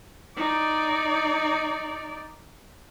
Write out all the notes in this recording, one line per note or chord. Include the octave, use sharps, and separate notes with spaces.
D#4 D5